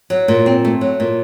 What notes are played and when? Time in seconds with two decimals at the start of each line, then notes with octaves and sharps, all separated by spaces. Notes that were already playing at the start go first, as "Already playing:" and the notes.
0.10 F#3
0.28 A#2
0.46 C4
0.65 A3
0.81 F#3
1.00 A#2